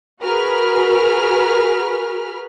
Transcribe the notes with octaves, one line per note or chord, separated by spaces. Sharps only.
F#4 G#4 A#4 B4 B5 F6